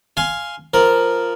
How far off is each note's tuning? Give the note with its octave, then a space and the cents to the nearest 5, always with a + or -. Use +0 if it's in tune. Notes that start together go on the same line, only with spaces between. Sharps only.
F5 +0 G#5 +5 C6 +0
F3 +0 A#4 +0